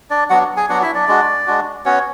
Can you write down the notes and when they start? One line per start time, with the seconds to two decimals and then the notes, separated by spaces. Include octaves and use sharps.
0.10 D4 D5
0.30 F#3 B3 D4 F#4 F#5
0.57 G#4 G#5
0.69 F#3 B3 D4 F#4 F#5
0.82 E4 E5
0.95 D4 D5
1.07 G#3 D4 F#4
1.47 G#3 D4 F#4
1.85 B3 C#4 F#4 C#5